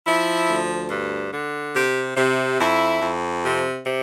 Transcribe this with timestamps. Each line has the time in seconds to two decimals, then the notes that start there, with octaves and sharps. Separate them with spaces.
0.06 F3 E4
0.49 D2
0.90 G2
1.33 D3
1.75 C3 G4
2.17 C3
2.60 F2 E4
3.01 F2
3.43 C3
3.85 C3